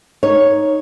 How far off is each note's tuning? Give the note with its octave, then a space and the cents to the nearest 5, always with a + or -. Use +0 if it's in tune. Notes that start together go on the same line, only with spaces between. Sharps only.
D#4 +0 C#5 +0